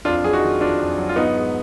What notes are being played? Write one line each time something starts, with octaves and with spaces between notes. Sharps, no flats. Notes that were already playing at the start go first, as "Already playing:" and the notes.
F2 D4 F4
F#3 G#4
D#4 F#4
D#3
F2 D4 F4
F2
F#3
F4
G#2 B3 D#4
G#3